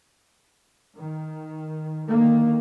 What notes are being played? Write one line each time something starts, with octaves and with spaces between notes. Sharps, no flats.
D#3
D3 D#3 A#3